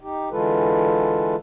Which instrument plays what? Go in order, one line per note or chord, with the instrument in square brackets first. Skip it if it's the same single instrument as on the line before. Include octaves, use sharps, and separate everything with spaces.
[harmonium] D#4 G4
D3 E3 G#3 F4 A4 B4